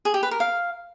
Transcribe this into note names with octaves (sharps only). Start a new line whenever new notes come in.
G#4
G4
B4
A#4
F5